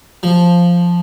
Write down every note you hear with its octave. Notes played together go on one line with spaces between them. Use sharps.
F3